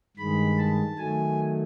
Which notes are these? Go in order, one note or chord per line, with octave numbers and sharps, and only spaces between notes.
G2 D#3 G#3 B5
A5
D#3 F#3 A3 G#5